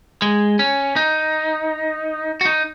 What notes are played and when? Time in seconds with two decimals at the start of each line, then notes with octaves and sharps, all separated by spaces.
0.22 G#3
0.59 C#4
0.96 D#4
2.41 F#4
2.45 D#4